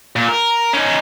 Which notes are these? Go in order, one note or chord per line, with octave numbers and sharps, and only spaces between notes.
A#2
A#4
C#4 D#4